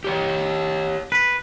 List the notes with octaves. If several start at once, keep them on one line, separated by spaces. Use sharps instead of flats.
G4 C#5 G5
B4